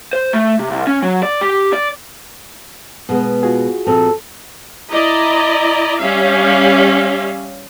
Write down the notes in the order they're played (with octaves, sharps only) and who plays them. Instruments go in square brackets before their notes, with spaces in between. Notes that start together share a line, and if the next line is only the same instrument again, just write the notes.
[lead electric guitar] C5
A3
C3
C2
C#4
F#3
D5
G4
D5
[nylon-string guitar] B2 G#3 B3
[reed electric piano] F4 F#4 G#4
[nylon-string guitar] A#2 F3 C4 [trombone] A4
[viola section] E4 D5 D#5 A#5
G3 C#4 E5 F5